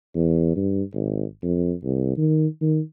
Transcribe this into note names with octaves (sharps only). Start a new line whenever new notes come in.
E2
G2
G#1
F2
C2
D#3
D#3